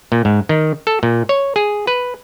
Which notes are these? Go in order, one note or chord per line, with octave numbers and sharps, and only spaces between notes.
A#2
G#2
D#3
A4
A#2
C#5
G#4
B4